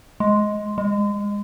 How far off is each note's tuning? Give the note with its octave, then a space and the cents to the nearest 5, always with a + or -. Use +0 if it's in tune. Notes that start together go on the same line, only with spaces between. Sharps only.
G#3 +10
G#3 -25